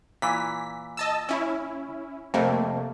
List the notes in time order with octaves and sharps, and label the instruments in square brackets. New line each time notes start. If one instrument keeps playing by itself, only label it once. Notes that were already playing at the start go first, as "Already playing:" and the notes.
[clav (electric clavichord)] A#2 E3 [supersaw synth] B6
[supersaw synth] D#5 A5 E6
C#4 E4
[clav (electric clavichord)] F2 [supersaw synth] C3 A3 A#3